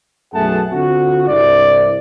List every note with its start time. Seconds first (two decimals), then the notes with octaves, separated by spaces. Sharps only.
0.34 B1 F#2 A3 G#4 F#5 A5
0.72 D3 C4 F4 F#4
1.29 C2 G2 E4 D5